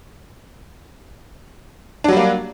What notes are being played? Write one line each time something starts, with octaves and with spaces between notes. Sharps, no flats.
F#3 G3 A#3 D4